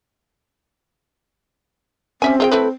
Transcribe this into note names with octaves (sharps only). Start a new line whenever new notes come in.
G3 C4 C#4 E5 G#5
F4 G#4 E5 G5
A3 E4 A4 B4